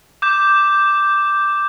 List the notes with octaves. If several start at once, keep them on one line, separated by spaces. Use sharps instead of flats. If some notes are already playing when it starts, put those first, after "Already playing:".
D6 G6 E7